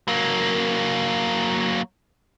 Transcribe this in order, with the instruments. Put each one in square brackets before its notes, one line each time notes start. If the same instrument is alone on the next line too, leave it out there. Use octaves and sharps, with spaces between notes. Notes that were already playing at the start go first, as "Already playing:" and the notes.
[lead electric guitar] F#3 A#3